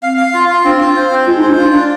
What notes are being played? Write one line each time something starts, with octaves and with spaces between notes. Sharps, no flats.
C4 F5
F5
F4
F4
C4 D4
F4
C5
C4
G#3 F4
D#4
C5
D4
F4
D4